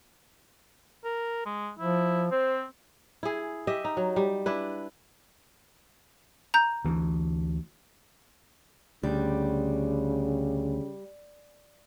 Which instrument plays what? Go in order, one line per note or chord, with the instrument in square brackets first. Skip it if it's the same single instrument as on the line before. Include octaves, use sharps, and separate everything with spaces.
[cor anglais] A#4
G#3
[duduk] F3 [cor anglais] E4
[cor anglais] C4 [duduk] C5
[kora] E4 G#4
G4 D#5 E5
D#4
F#3
G3
D4 E4 B4
[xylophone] A#5 G6
[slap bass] D2 E3
[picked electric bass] D2 [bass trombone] C#3 [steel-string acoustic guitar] G3